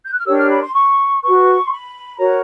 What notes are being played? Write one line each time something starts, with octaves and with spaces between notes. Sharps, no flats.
G6
F#6
F6
D4 G4 A#4 C#5 E6
F6
B5
C6
C#6
F#4 B4 C#6
C6
B5
F#4 A#4 C#5 A#5